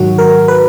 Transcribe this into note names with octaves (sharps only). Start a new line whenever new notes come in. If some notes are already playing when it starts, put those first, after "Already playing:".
Already playing: G#2 D#3 F#3 F#4
A#4
B4